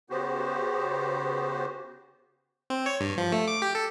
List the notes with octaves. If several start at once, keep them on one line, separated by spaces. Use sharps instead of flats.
C#3 B3 F#4 G4 C5
C4
C#5
G2
F3
A3
D6
G4
A4